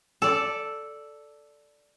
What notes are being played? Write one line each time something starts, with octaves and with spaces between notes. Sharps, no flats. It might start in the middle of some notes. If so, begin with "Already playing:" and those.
A4 D5